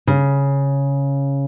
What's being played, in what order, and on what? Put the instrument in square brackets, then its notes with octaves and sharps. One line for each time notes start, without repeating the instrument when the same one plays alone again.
[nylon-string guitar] C#3